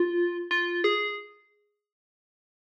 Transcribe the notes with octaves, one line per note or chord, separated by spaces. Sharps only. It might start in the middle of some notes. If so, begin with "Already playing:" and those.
Already playing: F4
F4
G#4